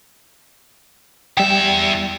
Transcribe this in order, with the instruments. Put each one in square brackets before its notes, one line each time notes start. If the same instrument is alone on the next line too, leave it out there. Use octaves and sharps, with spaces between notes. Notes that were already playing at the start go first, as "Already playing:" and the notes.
[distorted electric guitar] E2 E5 [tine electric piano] G3 G5